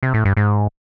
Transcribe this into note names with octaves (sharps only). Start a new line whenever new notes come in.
C3
A2
G2
G#2